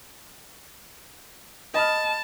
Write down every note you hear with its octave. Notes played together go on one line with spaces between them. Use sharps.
D#5 A5 B5 F6